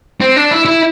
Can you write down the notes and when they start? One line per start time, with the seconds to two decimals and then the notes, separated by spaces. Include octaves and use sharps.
0.21 C4
0.36 D4
0.51 E4
0.66 E4